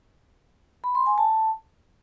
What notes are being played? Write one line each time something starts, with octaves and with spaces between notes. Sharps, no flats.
B5
C6
G#5
A5